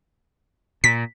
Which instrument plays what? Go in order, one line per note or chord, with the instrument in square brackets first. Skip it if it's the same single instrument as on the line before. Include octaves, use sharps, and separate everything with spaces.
[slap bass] A#2 [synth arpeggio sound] B6